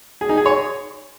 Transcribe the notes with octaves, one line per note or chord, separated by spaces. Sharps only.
G#4
D#4
G#4
C#5